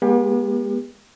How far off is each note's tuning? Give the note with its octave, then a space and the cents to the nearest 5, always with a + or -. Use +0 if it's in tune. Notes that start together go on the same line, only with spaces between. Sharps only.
G#3 +0 B3 -45 G4 +25